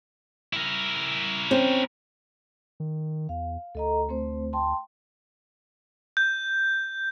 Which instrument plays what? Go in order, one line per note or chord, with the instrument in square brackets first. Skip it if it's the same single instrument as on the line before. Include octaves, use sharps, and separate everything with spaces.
[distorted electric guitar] E4 A#4
[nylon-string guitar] C4 C#4
[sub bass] D#3
[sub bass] E2 [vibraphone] F5
[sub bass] D2 [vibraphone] A4 D#5 A#5
[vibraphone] A3 C4 C5
G5 A5 C6
[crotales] G6